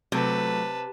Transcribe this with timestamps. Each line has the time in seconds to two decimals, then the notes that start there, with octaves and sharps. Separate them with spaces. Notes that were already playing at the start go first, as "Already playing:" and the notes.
0.12 C3 F#3 A3 B4 A5